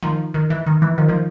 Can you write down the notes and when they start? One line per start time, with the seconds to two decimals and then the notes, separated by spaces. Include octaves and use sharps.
0.03 D#3 F3
0.34 D#3
0.50 E3
0.66 D#3
0.82 E3
0.98 D#3 F3
1.09 D#3 F3